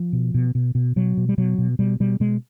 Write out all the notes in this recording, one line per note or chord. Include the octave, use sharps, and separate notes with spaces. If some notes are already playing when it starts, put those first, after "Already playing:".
Already playing: F3
B2
B2
B2
B2
B2 F#3
B2
G3
B2 F#3
B2
B2 G3
B2 G3
B2 G#3